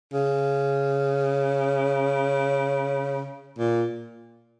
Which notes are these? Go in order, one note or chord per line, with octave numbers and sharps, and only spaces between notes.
C#3
A#2